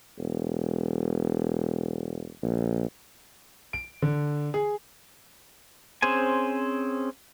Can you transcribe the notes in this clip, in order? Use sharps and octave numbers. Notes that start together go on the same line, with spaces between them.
E1
A#1
D7
D3
G#4
C4 C#4 G#4 C5 G#5